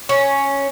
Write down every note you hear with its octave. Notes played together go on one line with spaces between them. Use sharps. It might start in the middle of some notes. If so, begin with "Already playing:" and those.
C#4